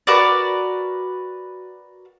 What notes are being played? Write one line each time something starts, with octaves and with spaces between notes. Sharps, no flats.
F#4 A#4 B4 D5